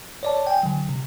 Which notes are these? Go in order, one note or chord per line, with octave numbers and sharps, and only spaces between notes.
C#5 D5 A5
G5 G#5
D3 F#3
C3